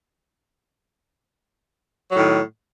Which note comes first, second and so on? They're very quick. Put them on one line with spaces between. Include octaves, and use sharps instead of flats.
F#3 A2 D#3